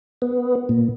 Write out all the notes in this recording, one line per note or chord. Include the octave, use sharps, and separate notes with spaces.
B3
A#2